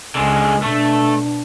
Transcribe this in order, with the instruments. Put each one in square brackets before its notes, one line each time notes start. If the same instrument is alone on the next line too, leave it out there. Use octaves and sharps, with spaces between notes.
[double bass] C#2 [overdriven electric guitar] D3 G#3
[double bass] B2 D4 [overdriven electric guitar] A3